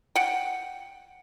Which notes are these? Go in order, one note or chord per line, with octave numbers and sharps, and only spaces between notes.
F#5 G5